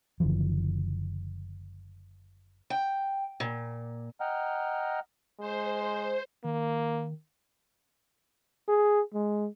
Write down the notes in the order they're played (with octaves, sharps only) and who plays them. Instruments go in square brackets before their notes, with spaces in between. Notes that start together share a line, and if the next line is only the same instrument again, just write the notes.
[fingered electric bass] F#1 D3 E3 F3
[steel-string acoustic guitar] G5
A#2
[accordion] D#5 F#5 G5 A#5 F6
[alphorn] G#3 [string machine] C5
[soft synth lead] D#3 [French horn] A#3
[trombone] G#4
G#3